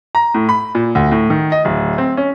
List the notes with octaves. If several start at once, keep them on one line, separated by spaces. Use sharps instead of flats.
A#5
A2
B5
A#2
D2
A2
D#3
D#5
D1
C4
C#4